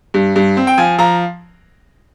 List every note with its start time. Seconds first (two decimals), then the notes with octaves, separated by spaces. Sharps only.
0.14 G2
0.36 G2
0.57 C4
0.67 G5
0.78 F3 G#5
0.98 F3 A#5